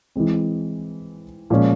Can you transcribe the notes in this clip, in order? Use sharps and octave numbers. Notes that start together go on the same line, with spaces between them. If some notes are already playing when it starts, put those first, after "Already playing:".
E3 G#3 C4
A#2 F3 G#3 C#4